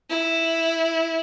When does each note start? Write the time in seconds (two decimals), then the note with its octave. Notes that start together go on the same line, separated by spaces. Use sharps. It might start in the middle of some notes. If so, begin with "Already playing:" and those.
0.10 E4